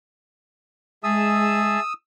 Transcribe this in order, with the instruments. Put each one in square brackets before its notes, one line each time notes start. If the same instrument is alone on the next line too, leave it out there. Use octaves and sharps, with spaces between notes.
[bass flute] G#3 [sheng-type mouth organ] G#4 E5 A5 [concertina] D#6 E6